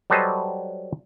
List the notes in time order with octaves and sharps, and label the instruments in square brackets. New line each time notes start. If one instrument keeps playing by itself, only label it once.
[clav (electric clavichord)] F#3 G3 A4 B4 C5 D#5